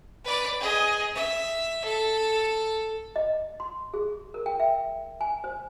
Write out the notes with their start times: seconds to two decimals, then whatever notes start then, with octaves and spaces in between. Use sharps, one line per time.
0.24 B4 D5
0.60 G#4 D#5
1.15 E5
1.85 A4
3.16 D#5
3.60 C6
3.94 G#4
4.34 A#4
4.46 G5
4.60 E5
5.21 G#5
5.44 C5